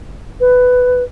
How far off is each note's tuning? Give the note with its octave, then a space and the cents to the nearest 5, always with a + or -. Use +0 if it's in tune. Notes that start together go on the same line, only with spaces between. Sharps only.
B4 +10